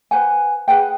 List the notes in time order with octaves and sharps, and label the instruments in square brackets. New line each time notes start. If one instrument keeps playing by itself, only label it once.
[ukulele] B4 C5 F#5 G#5
G#4 B4 F#5 G5